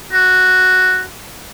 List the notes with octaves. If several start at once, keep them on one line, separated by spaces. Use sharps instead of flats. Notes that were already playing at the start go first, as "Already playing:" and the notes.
F#4